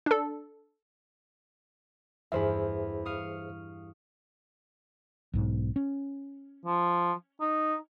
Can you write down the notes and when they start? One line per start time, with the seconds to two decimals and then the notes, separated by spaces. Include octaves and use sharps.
0.06 D4 A4
2.32 E2 G2 E4 G#4 C5 E5
3.05 F5 C#6 D#6
5.33 B1 G#2
5.76 C#4
6.65 F3
7.41 D#4